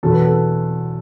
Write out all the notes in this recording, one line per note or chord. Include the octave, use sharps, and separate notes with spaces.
E2 B2 F#3 A4
B4
A4